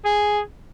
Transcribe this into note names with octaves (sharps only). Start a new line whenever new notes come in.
G#4